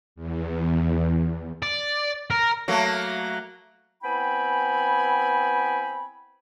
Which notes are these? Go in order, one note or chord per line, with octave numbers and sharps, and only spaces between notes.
E2
D5
A#4
F#3 A3 A#3
B3 C4 E4 G5 G#5 B5